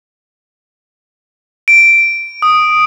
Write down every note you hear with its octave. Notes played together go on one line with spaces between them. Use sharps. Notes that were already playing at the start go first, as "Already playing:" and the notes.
D7
D#6